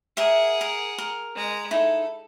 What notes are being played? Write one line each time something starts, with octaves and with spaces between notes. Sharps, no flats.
G#4 A#4 E5 F#5
A#4
A#4
G#3 A#5
D#4 E4 A4